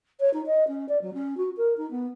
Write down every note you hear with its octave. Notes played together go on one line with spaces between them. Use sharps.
C#5
D#4
D#5
C#4
D5
F#3
C#4
F#4
A#4
D#4
B3